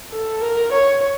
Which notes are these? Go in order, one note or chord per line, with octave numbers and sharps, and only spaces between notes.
A4
A#4
C#5